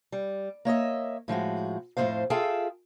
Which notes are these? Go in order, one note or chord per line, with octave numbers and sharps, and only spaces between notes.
G3
A#3 C#5 D#5 E5
A2 F3 G#3 F#4
F2 A2 G#3 A3 C5 F5
F4 G#4 A4 E5 F5 G5